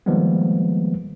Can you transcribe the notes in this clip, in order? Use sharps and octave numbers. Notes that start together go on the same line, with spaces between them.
D#3 F3 G3 G#3 A#3 B3